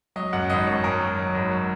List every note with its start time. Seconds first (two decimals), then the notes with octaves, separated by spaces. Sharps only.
0.16 F#3 D#5
0.33 F#2 F#5
0.50 G#1 D#5
0.67 F#2 C#5
0.84 G#1 A#4
1.01 F#3
1.18 F#3
1.35 G#1
1.51 F#3